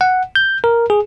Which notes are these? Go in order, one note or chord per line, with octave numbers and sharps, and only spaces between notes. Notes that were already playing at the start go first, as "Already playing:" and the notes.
F#5
G6
A#4
G#4